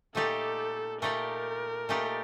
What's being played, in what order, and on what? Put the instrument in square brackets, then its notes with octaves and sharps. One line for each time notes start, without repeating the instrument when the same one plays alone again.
[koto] A#2 A3 D#4 G4 D5 [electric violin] A4
[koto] A#2 A3 D#4 G4 D5 [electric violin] A#4
[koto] A#2 A3 D#4 G4 D5